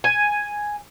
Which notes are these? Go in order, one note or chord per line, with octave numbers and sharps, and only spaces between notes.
G#5